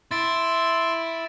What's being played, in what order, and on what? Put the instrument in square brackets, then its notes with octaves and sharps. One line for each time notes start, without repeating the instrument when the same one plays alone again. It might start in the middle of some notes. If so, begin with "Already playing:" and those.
[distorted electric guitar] E4 [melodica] C6 [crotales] A6 D7